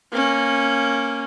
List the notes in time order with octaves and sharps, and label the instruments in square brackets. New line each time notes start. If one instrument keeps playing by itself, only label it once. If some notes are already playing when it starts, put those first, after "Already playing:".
[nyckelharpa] A#3 C#4